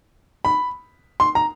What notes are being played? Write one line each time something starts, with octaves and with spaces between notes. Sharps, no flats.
B5
C6
A#5